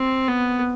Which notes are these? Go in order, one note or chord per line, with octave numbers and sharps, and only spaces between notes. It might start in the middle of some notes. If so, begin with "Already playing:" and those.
Already playing: C4
B3